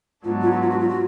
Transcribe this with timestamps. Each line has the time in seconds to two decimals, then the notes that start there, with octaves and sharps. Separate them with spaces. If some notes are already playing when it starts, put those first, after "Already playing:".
0.23 G#2 F#3 B3 D4 F4
0.42 F4
0.51 F#4
0.61 F4
0.70 F#4
0.80 F4
0.89 F#4